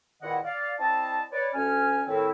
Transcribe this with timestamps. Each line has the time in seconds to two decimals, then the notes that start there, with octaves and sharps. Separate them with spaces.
0.22 E2 A#2 D#3 E4 D#5 F#5
0.44 D5 F5
0.79 C4 E4 D5 D#5 A5
1.31 B4 C#5 D5
1.54 D2 C#4 G#5 F6
2.07 A2 D#3 C4 E4